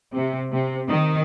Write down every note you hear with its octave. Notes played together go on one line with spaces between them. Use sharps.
C3
C3
D#3